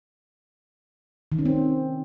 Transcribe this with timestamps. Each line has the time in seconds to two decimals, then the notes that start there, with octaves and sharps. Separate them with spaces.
1.32 D#3
1.39 C#4
1.45 C4